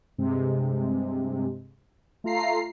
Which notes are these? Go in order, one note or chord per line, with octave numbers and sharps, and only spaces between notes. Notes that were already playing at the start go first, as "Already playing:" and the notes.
G2 C3 G#3
A3 F4 A#5 C7